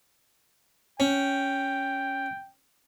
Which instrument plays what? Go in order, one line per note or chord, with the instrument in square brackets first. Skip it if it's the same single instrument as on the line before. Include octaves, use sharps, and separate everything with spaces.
[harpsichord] C#4 [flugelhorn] G5